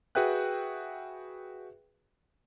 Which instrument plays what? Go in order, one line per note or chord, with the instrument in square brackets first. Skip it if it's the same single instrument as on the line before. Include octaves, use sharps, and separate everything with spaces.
[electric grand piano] F#4 G#4 B4 E5 G5 F#6